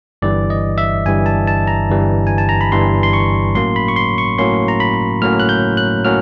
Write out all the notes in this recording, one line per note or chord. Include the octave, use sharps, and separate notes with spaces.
G1 G2 E3 G3 D5
D#5
E5
G1 G2 E3 G3 G#5
A5
A5
A#5
G1 G2 E3 G3
G#5
A5
A#5
B5
G1 G2 E3 G3 C6
C6
C#6
A2 F#3 A#3 C#4 C6
B5
C#6
C6
C#6
A2 F#3 A#3 C#4 C6
A#5
B5
A2 F#3 A#3 C#4 F6
F#6
G6
F#6
A2 F#3 A#3 C#4 F6